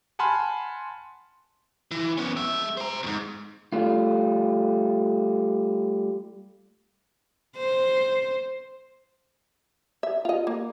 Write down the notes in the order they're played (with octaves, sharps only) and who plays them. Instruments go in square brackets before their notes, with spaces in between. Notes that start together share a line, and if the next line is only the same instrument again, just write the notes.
[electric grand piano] F#5 G#5 A5 B5 C6 F6
[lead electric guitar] E3
B3 C#4
G#3 E5
C5 A#5
E2 G#2
[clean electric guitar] G3 A3 F4
[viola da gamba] C5
[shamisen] E5
F4 D#5
A#3